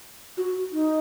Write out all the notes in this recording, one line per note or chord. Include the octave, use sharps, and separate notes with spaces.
F#4
D#4